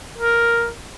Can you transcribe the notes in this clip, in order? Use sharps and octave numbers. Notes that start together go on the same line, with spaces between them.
A#4